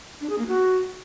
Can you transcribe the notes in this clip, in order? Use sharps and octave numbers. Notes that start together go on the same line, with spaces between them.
D4
G#4
A#3
F#4